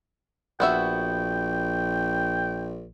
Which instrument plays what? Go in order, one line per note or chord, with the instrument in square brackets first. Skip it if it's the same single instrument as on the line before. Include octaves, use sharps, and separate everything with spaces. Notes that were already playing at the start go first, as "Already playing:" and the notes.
[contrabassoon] A#1 [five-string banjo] B3 F#4 E5 [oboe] G5